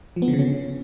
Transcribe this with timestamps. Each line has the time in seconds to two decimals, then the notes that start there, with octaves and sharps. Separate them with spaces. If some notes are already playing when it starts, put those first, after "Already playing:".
0.16 F3
0.22 B3
0.28 D3
0.33 C#3
0.39 C#4